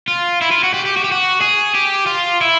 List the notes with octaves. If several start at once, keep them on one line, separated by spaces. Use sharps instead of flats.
F4
E4
F4
F#4
G4
G4
F#4
G4
F#4
G#4
G4
F4
E4